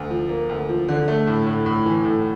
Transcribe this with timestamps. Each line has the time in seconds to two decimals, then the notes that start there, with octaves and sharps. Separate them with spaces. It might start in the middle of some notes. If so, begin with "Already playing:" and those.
Already playing: D2
0.10 F3
0.29 A#3
0.49 D2
0.69 F3
0.88 D3
1.08 A3
1.27 A2
1.46 A2
1.66 A2
1.86 E3
2.05 A2